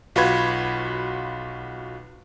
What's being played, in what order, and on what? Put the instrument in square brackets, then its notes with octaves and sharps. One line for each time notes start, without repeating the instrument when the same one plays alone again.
[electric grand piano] B1 F4 F#4 B4 B5 G#6